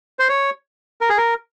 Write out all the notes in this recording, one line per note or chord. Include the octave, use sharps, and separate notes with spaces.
C5
C#5
A#4
G#4
A#4